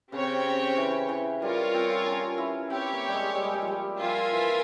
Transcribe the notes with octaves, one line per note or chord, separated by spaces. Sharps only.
C#3 C4 G4 C#5 G5
E3
E3
G3 F4 A#4 C#5
C4
C#4
E4
C4 G4 C#5 G5
A#3
G3
G#3
G3
G#3
G3
F3
G3
F3 F4 A#4 E5 G#5
E3